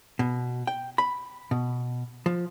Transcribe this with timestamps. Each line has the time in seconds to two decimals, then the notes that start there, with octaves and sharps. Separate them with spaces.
0.19 B2
0.67 G5
0.98 B5
1.51 B2
2.26 F3